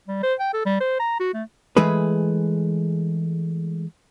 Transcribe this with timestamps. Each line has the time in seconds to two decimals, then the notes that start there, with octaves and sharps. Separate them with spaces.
0.08 G3
0.23 C5
0.40 G5
0.54 A4
0.66 G3
0.80 C5
1.00 A#5
1.20 F#4
1.34 A3
1.77 E3 G#3 A3 G#4 B4